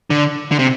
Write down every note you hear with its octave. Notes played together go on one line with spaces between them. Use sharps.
D3
D3
C3